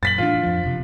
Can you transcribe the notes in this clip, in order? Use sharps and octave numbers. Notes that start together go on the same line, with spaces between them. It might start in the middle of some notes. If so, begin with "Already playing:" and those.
F#2 A#2 A6 B6 F#7
A2 E3 D4 F4
F2 F3
E1 C3